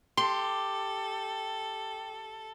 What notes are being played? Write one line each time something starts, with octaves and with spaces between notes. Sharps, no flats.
G4 A4 C6